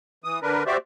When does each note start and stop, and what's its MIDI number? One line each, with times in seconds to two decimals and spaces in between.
0.24 0.39 52
0.24 0.39 87
0.42 0.63 50
0.42 0.63 62
0.42 0.63 70
0.42 0.63 71
0.66 0.77 66
0.66 0.77 67
0.66 0.77 72
0.66 0.77 74
0.66 0.77 76